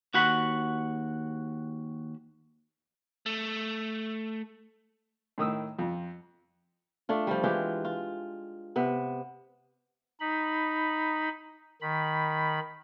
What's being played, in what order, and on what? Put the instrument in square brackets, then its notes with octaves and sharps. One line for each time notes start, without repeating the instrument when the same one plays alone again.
[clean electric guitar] D#2 F#4 F#5 B5
[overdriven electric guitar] A3
[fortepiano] A2 D#3 D#6 E6
F2
[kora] A3 D4 F4
F3 G3
E3 G#3 F4 G4
F4
C3 B3 E5
[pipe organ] D#4 B5
D#3 B5